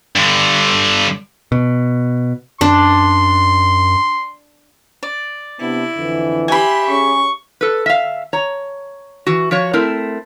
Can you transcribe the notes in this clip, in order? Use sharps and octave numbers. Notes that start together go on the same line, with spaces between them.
G2 D3
B2
F#2 D4 C6
D5
C3 B3 D4 E4
F2 D3 E3
G4 E5 G#5 B5 C6
C#4 G#4 C#6
A4 B4
E5 F5
C#5 A#5
E3 F#4
F3 F#4 C#5
A3 C4 E4 A#4